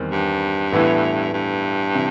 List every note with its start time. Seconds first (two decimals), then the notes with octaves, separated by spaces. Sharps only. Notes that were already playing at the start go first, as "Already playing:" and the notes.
Already playing: E2 D#3 G3 C4
0.11 G2
0.72 A2 E3 B3 E4
1.33 G2
1.95 C3 E3